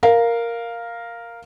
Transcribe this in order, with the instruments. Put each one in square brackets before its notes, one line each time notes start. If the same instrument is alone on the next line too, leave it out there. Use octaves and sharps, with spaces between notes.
[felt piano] A#4 F5